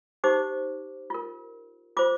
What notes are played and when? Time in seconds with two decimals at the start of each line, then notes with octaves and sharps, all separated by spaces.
0.24 D#4 G4 C5 D6
1.10 F4 A#4
1.97 F4 C5 D6